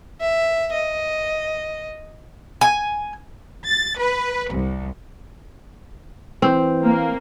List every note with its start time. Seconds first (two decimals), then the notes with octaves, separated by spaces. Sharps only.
0.21 E5
0.73 D#5
2.61 G#5
3.67 A6
3.98 B4
4.52 C2
6.42 E3 C4
6.84 A#3